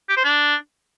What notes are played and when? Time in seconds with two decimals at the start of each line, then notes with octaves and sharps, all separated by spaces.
0.09 G4
0.17 C5
0.24 D4